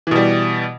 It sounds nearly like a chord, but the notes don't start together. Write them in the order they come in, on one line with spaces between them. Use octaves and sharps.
E3 B2 G3